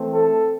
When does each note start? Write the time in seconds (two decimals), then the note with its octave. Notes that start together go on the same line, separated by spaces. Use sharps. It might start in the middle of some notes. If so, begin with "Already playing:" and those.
Already playing: E3 A3 C4
0.11 A4